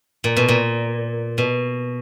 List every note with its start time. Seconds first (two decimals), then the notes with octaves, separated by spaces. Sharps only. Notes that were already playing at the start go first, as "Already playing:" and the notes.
0.24 A#2
0.37 B2
0.48 A#2
1.38 B2